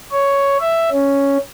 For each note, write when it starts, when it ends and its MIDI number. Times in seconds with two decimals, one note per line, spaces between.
0.12 0.57 73
0.60 0.89 76
0.91 1.38 61